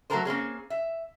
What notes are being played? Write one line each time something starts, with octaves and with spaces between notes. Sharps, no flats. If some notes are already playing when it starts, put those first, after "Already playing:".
F#3 A3 A#3 A4 A#4 C5
A#3 C4 C#4 G#4
E5